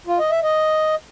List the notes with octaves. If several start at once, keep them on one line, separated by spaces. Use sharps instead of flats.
F4
D#5
E5
D#5